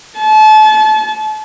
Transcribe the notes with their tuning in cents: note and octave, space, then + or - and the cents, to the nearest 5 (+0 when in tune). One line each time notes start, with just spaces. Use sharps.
A5 -35